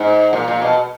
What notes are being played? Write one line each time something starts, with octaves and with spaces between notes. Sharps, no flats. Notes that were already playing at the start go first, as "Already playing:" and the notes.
Already playing: G#2
A#2
A#2
B2